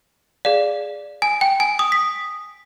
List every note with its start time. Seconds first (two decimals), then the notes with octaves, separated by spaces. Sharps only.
0.45 G#4 D5 F5
1.22 G#5
1.41 G5
1.60 G#5
1.79 D#6
1.92 B6